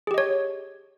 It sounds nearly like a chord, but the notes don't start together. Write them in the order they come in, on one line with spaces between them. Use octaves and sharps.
G#4 G4 D#5 C#5